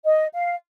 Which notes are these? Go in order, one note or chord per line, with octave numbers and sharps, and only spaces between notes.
D#5
F5